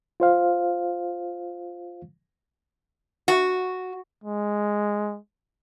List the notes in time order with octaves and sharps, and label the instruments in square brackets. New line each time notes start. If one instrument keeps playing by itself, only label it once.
[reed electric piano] F4 C5 F5
[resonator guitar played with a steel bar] F#4
[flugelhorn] G#3